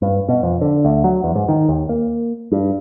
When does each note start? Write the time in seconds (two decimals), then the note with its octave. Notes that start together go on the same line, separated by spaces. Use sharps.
0.02 G2
0.29 B2
0.43 F2
0.61 D3
0.85 D2
1.04 F#3
1.24 E2
1.35 G#2
1.49 D#3
1.69 D#2
1.89 A#3
2.52 G2